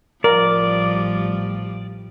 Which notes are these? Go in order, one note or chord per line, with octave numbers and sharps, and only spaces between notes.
A1 F3 G3 A#4 D5